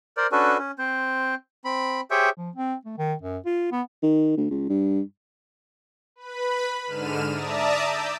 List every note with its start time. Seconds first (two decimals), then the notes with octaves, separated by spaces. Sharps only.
0.17 A#4 C5 D5
0.32 C#4 D4 F#4 A4 B4
0.58 C#4
0.79 C4 C5
1.65 C4 B5
2.11 G4 G#4 C5 C#5 E5 G5
2.38 F3
2.56 C4
2.85 A3
2.98 D#3
3.22 F#2
3.46 F4
3.72 B3
4.03 D#3
4.37 D2
4.51 C#2
4.70 G2
6.16 B4 B5
6.86 G#2 D3 F6 D#7 E7
7.31 D5 E5 A5 A#5 D#6
7.81 D6 E6 G6